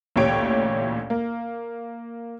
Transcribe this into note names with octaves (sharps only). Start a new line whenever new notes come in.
A1 D2 A#2 G4 C#5 D7
A#3